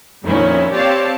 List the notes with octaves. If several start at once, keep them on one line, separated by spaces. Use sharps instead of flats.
F2 A#2 D#3 C#4 E4
C4 G4 C#5 D5 F5 A5